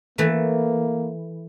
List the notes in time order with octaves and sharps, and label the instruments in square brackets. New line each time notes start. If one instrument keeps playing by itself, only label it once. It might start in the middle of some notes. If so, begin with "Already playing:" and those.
[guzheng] E3 A3 [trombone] A#3